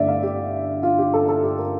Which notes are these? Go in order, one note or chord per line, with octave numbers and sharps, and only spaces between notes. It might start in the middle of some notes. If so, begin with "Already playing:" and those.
Already playing: G1 G2 D3 A3 D5 E5
F5
G4
F4
G4
A4
A4
G4
A#4